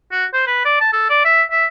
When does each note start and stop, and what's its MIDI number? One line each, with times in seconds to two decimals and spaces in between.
0.11 0.25 66
0.33 0.45 72
0.47 0.64 71
0.65 0.76 74
0.80 0.88 81
0.93 1.07 69
1.09 1.20 74
1.25 1.43 76
1.51 1.65 76